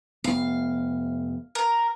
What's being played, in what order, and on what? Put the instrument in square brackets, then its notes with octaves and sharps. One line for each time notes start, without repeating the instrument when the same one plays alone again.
[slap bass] F1 B3 [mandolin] F5
[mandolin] A#4